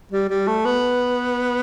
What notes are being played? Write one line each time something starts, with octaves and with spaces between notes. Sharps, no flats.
G3
G3
A3
B3